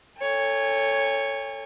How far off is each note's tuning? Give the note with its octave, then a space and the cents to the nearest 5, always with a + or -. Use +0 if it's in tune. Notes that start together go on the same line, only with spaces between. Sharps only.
A4 +15 C#5 +0 G#5 -45